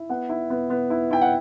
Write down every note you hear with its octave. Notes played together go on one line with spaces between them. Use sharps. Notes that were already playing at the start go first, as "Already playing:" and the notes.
Already playing: E4
B3 F#5
E4
B3
B3
E4
E4 G5
F#5